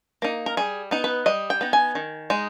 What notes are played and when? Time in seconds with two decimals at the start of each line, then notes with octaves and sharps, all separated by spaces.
0.22 A#3 D#4
0.46 A#4
0.57 G3 G#4
0.91 B3 D#4
1.04 B4
1.26 G3 D#5
1.50 G5
1.61 B3 D#4
1.73 G#5
1.95 D#3
2.30 G#3 D#4